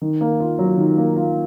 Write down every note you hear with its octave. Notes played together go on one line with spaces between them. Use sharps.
D#3
A#3
F4
F#3
D#3
A#3
F4